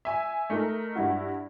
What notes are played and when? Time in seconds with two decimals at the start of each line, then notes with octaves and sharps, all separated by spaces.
0.05 E5 G#5
0.50 A3 D#4 A#4
0.95 G2 E4 F#4